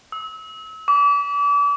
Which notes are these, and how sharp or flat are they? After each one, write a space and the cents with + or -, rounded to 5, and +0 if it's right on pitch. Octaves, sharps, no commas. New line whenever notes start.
E6 -35
D6 -35